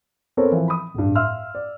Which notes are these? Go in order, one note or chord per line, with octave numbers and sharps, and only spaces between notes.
B3 C4 A4 A#4 C#5
E3 F3
B5 D#6
D1 G2
E5 F5 C6 E6 F6
D5